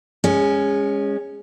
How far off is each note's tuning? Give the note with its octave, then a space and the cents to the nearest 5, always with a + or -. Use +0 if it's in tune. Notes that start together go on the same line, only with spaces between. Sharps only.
G#3 -25 C#4 +0